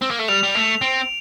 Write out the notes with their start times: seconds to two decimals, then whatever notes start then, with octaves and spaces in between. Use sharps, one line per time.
0.02 C4
0.11 A#3
0.19 A3
0.28 G3 F7
0.44 G3
0.55 A3 F7
0.82 C4 D7